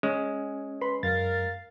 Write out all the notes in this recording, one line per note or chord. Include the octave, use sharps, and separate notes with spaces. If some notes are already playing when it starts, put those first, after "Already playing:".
G#3 C#4
B4 B5 C6
F#2 A#4 F5 A6